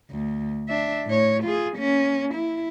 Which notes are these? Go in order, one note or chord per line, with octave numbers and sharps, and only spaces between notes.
D2
D4 E5
A2 C#5
F4 G#4
A#3 C#4
E4